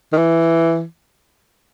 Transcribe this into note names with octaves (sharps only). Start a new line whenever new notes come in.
D#3
E3